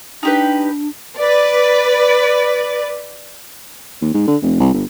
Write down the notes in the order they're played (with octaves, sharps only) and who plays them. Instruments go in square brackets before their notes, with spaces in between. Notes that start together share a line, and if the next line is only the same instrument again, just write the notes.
[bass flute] D4 [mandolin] D#4 G4 B4
[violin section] B4 D5
[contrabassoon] D#2
G#2
D3
F1
C2
G1